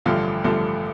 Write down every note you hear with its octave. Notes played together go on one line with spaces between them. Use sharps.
A1 G2 D3 F3 A3 F4
A1 G2 D3 F3 A3